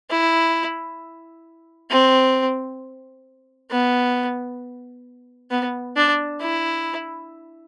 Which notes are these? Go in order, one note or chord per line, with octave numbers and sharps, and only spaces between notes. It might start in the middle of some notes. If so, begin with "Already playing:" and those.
E4
C4
B3
B3
D4
E4